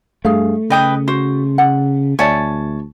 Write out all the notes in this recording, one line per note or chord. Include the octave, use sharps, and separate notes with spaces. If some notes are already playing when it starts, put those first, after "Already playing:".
G2 A3 G#4 F5
C#3 B4 D#5 G5 D#6
F#4 C5
F#5
D2 C#5 D5 E5 G#5 A5